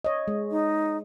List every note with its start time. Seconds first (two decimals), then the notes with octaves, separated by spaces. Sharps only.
0.04 C#5 D#5
0.28 G#3
0.51 D#4